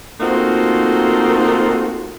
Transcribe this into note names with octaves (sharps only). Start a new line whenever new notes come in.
A3 A#3 C4 D#4 F4 F#4